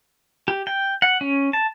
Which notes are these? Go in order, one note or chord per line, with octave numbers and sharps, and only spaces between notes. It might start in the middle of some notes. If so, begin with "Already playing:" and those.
G4
G5
F#5
C#4
A5